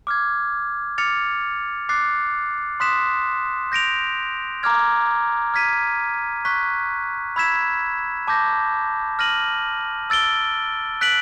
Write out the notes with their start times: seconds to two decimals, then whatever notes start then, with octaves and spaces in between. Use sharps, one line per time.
0.07 D6 F6 G#6
0.98 D6 F6 A6 C#7 F7
1.89 D6 F#6 A6 C7
2.80 C6 D#6 F#6 B6 E7
3.72 G6 A#6 D7 F7
4.63 A#5 D6 F6 G#6
5.54 F6 G#6 B6 D#7
6.45 C#6 F#6 B6
7.36 B5 E6 G#6 B6 E7
8.27 A5 D6 G6 A#6
9.19 F6 A#6 D#7 F#7
10.10 E6 A6 D7 G7
11.01 F#6 B6 D7 F#7